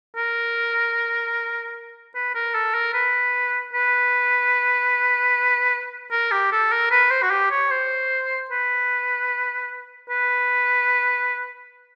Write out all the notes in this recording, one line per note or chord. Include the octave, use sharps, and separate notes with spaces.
A#4
B4
A#4
A4
A#4
B4
B4
A#4
G4
A4
A#4
B4
C5
F#4
G4
C#5
C5
B4
B4